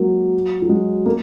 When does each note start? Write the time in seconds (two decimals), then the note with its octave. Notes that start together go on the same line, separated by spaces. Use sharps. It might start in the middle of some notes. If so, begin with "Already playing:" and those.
Already playing: F#3 G#3 A#3
0.62 F#3
0.69 G#3
1.06 A#3